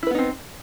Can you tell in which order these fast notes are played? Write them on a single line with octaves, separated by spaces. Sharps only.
E4 B4 B3 D#4 C4